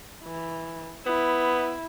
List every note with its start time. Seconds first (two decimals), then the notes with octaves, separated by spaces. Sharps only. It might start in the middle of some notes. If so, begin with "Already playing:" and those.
0.24 E3
1.06 B3 E4